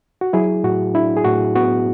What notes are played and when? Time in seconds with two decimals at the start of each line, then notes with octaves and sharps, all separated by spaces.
0.21 F#4
0.33 F#3 E4 G#4
0.64 A2 F#4
0.94 D4 E4
1.17 G#4
1.25 A2 F#4
1.55 B3 F#4